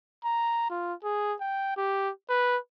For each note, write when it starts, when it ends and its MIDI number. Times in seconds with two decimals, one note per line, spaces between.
0.25 0.65 82
0.71 0.94 65
1.04 1.35 68
1.41 1.74 79
1.77 2.11 67
2.30 2.58 71